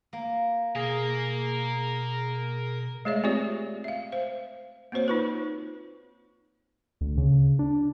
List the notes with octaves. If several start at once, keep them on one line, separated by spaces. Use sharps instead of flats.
A#3
B2 G#4 A#4 F5
G#3 A3 G#4 C#5 D5 E5
C4 F4 G4 C#5 D5
E5 F5
C5 F5
A#3 C4 F#4 C5 C#5
D#4 F4 B4
D2
C#3
D4